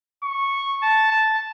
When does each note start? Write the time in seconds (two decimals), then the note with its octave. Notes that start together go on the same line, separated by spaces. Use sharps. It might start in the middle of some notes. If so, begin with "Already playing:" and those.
0.24 C#6
0.82 A5
1.11 A5